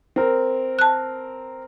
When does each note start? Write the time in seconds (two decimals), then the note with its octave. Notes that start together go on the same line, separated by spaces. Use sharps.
0.16 C4 A#4
0.79 A5 F#6